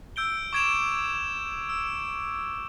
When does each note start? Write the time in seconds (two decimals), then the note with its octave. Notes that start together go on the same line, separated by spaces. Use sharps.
0.16 E6 G6 D7 G7
0.53 C#6 D6 G#6 D7 E7 F7
1.69 E6